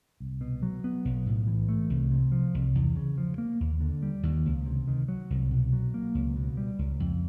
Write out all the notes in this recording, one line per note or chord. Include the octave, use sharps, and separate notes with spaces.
C2
B2
F#3
B3
B1
A2
E3
A3
C2
C3
F3
C2
E2
C#3
F3
A#3
D#2
D3
G3
D#2
C#2
C3
D#3
F#3
C2
B2
F#3
A#3
C#2
B2
G3
C#2
F2